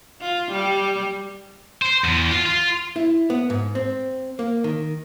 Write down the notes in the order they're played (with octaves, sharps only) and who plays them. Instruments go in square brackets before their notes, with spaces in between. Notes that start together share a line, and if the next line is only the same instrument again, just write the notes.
[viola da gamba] F4
G3
[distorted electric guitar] C5
E2
F4
F4
[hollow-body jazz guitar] E4
B3
G#2
C4
A#3
D#3